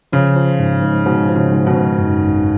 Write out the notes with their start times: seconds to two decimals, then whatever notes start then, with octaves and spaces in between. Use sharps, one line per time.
0.13 C#3 F3
0.36 F3
0.59 G#2
0.82 G#2
1.06 G#2 B2
1.29 F3
1.36 C#3
1.52 G#2
1.67 B2 D#3
1.74 G#2
1.98 F#2
2.21 G#1